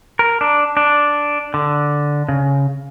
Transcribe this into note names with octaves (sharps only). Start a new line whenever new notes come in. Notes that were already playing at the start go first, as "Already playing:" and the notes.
A#4
D4
D4
D3
C#3